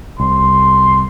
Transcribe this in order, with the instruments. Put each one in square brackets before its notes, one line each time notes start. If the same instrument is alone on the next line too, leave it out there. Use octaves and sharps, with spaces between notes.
[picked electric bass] C2 [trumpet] C6